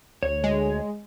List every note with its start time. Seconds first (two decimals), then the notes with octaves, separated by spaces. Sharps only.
0.23 D2 C#5
0.44 G#3